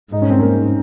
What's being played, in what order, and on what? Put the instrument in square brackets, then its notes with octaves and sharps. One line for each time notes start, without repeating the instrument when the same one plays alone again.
[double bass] G#2 [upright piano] D#4
[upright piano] C#4
C4
A#3 C#4